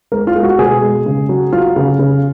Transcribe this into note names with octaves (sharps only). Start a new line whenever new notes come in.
G#3 A#4
F4
G#3
F#4
B2 G#4
G#3
C#3
F#3
F#3 F4
C#3
C#3